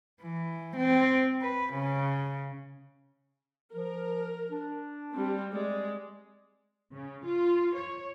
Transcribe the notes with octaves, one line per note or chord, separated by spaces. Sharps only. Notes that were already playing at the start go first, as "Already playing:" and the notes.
E3
C4
B4
C#3
F3 A#4
D4
G3 C4
G#3 D5
C#3
F4
C#5